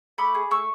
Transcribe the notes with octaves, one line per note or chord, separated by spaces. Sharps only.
A3 B5 D6
G#4
A3 C#6 E6